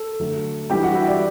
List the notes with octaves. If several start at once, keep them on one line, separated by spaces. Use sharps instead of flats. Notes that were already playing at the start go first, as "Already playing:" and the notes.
Already playing: A4
D3 F#3 A3
E3 G3 D4 G4 G5
F#4 F#5
E4 E5
D5